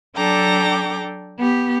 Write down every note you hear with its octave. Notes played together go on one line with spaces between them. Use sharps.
F#3 D4 A4 G5 A#5 D6
B3 G4